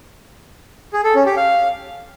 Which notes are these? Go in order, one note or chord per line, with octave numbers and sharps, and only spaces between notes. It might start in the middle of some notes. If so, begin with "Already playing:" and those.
G#4
A4
C#4
G4
F5